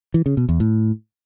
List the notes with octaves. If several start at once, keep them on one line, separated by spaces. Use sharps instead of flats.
E3
C#3
B2
E2
A2